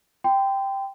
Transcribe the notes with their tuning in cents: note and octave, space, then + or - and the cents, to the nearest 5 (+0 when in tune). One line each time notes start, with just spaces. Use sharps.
G5 +0 C6 -35